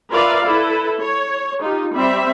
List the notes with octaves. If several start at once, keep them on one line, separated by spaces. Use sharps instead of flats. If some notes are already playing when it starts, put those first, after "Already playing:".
F4 A#4 B4 D5 E5 F5
E4 A4 B4
C#5
D#4 F4 G4
G3 C4 E5 B5